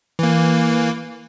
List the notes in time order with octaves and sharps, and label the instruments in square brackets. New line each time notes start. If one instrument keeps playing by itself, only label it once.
[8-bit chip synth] E3 A#3